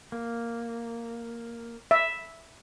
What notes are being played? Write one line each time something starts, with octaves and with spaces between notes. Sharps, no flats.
A#3
E5